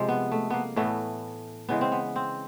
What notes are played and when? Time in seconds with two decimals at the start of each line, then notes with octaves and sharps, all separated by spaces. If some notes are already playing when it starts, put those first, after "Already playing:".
Already playing: C3 F3 G#3
0.08 B3
0.32 A3
0.50 A#3 B3
0.76 A2 E3 A3 B3
1.69 C#3 E3 G#3 B3
1.81 C4
1.92 B3
2.16 C4